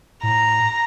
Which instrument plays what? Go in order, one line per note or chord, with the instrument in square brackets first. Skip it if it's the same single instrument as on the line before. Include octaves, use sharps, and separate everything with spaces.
[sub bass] A2 [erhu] A#5